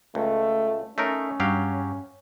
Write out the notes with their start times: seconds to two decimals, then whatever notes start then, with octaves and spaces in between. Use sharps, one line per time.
0.15 C#2 A3
0.98 A3 C#4 D#4 A#4
1.40 G2 F#3 G4 F5